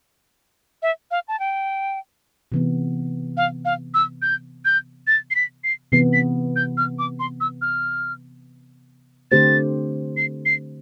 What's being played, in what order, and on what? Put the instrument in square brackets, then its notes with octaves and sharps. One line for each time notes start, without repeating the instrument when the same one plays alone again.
[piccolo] E5
F5
A5
G5
[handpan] C3 E3 B3
[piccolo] F5
F5
E6
G6
G6
A6
C7
B6
C7
[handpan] C3 E3 B3 [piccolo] C7
[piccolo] B6
G6
F6
D6
C6
E6
F6
[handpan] D3 A3 C4 G4 C5 [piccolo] A6
[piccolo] C7
C7